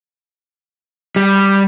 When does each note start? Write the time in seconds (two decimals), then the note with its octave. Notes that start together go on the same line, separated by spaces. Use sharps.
1.16 G3